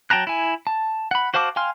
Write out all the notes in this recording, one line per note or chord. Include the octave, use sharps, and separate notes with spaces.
F#3 G5 A5 A#5 F#6
E4 G#5
A5
F#5 B5
F#4 C5 F5 A5 D6
F5 G5 G#5 C6 F6